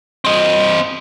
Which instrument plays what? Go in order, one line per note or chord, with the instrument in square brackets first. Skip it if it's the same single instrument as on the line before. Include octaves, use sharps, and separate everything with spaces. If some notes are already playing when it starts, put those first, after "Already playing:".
[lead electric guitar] C4 D#5